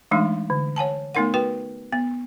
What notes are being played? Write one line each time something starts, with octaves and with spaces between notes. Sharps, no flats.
E3 G#3 A3 D4 D#4
D3
C#5 F#5 G#5 A5
A3 B3 D#4 A#4 F#5
F#4 B4 G5
B3